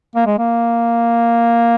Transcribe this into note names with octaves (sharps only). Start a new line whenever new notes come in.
A#3
G#3
A#3